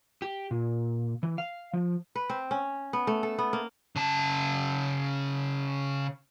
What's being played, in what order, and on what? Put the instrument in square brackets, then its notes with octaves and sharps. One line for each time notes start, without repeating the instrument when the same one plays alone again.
[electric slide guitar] G4
A#2
E3
F5
F3
[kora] B4
C4
C#4
B3
A3
A4
B3
A#3
[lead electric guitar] C#3 A5